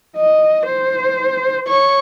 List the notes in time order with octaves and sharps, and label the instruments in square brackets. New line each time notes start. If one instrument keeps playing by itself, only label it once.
[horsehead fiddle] D#5
C5
[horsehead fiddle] C#5 [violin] C#6